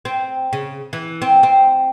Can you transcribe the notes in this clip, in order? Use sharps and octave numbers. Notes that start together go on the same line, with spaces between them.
C4
C#3
E3
C4
C4